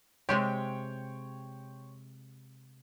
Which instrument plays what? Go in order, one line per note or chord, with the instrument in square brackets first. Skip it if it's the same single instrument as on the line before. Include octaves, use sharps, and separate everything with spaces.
[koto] C3 G#3 G4 [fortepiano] C#5 G5 C6